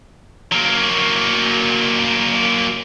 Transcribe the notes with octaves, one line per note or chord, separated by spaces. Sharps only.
F#3 A#3